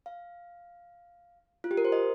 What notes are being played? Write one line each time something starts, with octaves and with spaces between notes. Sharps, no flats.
F5
F4
G4
A#4
C5
D#5